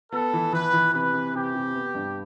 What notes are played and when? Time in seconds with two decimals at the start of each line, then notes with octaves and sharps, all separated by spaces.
0.12 B3 A4
0.33 E3
0.53 E3 B4
0.73 E3
0.94 C3 B4
1.13 C3
1.34 C3 G4
1.55 C3
1.75 B3
1.95 G2